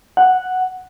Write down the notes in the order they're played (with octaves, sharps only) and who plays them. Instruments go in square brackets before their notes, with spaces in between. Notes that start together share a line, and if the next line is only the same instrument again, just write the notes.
[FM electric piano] F#5